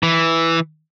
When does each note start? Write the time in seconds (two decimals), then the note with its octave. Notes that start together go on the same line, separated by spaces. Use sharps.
0.03 E3